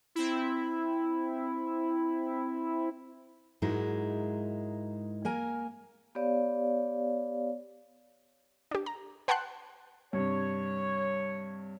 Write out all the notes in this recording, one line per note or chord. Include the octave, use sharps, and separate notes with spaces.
C4 E4
G#2 F#3 G#3 D#4 E4 A#4
A#3 A#4 G#5 A#5
B3 G4 C#5 D5 F5
D4 G4
A#5
B4 F#5 G5 A5 C6 F#6
G2 C3 C#5